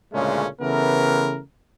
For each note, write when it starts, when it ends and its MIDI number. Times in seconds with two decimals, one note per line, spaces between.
0.13 0.46 38
0.13 0.46 46
0.13 0.46 49
0.13 0.46 56
0.13 0.46 57
0.13 0.46 61
0.60 1.39 49
0.60 1.39 52
0.60 1.39 57
0.60 1.39 59
0.60 1.39 70